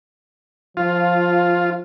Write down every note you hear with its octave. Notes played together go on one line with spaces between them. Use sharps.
F3 F4